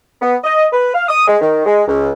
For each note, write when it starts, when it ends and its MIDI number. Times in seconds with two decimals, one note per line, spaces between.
0.22 0.36 59
0.44 0.66 75
0.73 0.90 71
0.95 1.05 77
1.09 1.26 87
1.28 1.37 56
1.41 1.64 51
1.66 1.83 56
1.88 2.12 37